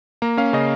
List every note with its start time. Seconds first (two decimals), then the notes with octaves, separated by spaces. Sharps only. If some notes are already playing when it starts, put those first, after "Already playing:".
0.22 A#3 A#5
0.37 C#4 F5
0.53 C#3 D#5